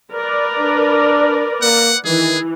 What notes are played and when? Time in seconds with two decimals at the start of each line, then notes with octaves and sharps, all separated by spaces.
0.13 A#4 B4 D5
0.59 D4
1.62 A#3 F#5
2.05 D#3 E3 G#4